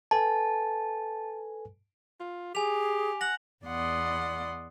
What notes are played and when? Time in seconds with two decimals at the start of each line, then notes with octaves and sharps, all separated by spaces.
0.11 A4 B4 G#5 A5
2.20 F4
2.55 G4 G#4 G#5 F7
3.21 F#5 A#6 F#7
3.65 E2 B3 D5 D#5 F#5 C6